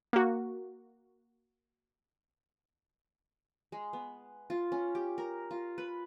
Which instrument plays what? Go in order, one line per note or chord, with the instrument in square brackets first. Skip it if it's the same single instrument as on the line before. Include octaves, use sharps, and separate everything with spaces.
[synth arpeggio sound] A#3 F#4
[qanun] G#3
B3
F4
C#4
G4
A#4
F4
B4